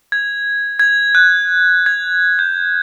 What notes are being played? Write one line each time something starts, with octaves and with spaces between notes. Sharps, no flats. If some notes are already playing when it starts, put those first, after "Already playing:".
G#6
G#6
F#6
G#6
G6